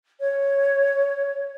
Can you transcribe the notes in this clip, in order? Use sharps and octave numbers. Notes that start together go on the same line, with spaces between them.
C#5